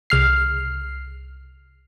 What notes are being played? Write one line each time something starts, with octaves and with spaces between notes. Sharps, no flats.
C2 F6 C7